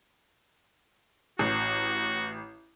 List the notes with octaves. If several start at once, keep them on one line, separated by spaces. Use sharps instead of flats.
A1 F#4